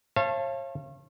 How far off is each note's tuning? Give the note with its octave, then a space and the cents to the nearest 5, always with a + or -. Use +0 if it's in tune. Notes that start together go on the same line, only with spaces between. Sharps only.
C#5 -40 F5 -35 A5 +0